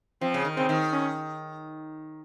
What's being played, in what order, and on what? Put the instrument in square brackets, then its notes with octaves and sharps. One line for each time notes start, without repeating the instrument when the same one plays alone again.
[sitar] F3 [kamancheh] C4
[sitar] C#3
D#3
[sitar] C#3 [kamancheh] C4
[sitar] D#3
[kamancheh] C#4